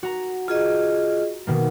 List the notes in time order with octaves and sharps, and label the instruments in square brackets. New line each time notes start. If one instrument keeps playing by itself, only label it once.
[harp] F#4 A#5
[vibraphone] F4 G#4 D#5
[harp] B2 D#3 A#3